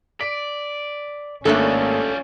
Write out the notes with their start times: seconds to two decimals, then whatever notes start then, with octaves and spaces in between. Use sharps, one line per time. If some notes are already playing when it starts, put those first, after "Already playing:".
0.21 D5 B6 D7
1.45 G#1 G3 A3 A#3 C#4 D4 F4 A4